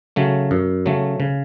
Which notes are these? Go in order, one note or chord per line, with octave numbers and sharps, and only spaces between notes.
C#3 F#3 A3
F#2
C#3 F#3 A3
C#3